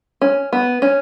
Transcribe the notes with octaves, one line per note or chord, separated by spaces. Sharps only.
C#4
B3
C#4